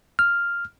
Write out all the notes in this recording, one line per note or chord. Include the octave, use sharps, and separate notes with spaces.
F6